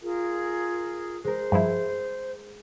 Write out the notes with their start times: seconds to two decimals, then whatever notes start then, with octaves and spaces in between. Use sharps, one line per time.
0.02 F4 G#4 A#4
1.24 G#3 A#4 C5
1.52 G2 F3 E4